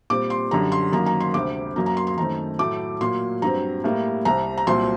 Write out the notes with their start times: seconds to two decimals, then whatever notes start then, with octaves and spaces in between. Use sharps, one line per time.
0.10 A#2 G3 C4 D6
0.30 C6
0.51 F#2 D3 G3 A#5
0.72 C6
0.93 F#2 D#3 F#3 A#3 A#5
1.06 A#5
1.20 C6
1.34 D2 C3 G3 C4 D6
1.76 F#2 F#3 A#3 A#5
1.86 A#5
1.97 C6
2.07 C6
2.17 F#2 D#3 A3 C4 A#5
2.59 A2 F#3 A3 D6
3.01 A#2 F#3 A#3 C6
3.42 G2 F#3 C4 A#5
3.84 A2 G3 A#3
4.25 C2 C3 G3 A#5
4.57 A#5
4.67 C2 A#2 F#3 C4 C6